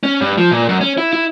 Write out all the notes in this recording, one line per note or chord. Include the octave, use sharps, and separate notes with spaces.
C#4
G2
F3
A#2
F#2
C#4
E4
E4